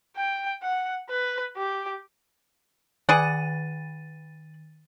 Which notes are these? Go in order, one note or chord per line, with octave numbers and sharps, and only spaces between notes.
G5
F#5
B4
G4
D#3 G#4 D5 F#5 A6 D#7